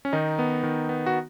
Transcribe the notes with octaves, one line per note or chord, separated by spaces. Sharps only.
C#4
D#3 D#4
B3
D#3
B3
F#4